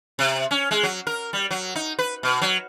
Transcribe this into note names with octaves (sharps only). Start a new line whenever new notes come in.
C3
C#4
G#3
F#3
A#4
G3
F#3
D#4
B4
B2
F#3